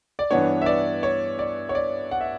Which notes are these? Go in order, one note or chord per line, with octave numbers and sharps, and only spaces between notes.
D5
G2 E3 B3 D4 C#5
E5
D5
C#5
D5
C#5
D5
F#5
E5